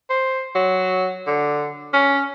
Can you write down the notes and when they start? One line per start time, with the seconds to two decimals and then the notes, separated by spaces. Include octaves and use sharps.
0.10 C5
0.55 F#3
1.27 D3
1.93 C#4